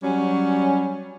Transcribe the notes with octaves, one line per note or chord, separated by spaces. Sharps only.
F#3 G3 C#4